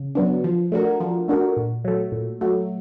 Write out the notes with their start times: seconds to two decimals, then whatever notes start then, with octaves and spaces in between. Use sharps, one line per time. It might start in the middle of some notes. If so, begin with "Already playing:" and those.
Already playing: C#3
0.15 F#3 B3 D4
0.44 F3
0.72 A3 D4 F#4 A#4
1.00 F3
1.28 A3 D4 F#4 A#4
1.57 A#2
1.84 F#3 A3
2.12 A#2
2.41 F#3 A3